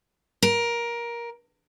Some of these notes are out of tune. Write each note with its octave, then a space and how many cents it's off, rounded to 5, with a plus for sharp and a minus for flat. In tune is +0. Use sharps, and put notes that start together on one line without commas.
A#4 +15